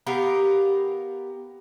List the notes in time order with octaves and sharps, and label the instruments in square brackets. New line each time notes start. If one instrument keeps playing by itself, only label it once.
[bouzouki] B3 G4 A#4 F5